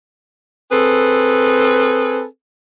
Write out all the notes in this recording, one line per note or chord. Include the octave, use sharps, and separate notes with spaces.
C4 G#4 A4 B4